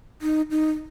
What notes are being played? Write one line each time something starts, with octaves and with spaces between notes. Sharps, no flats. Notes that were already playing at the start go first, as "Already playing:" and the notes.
D#4
D#4